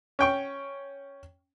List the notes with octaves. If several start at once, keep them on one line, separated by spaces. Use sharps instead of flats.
C#4 G5 C#6